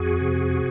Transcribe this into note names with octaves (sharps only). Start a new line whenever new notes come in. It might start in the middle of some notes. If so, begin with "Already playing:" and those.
Already playing: F2 F#4 G#4
C3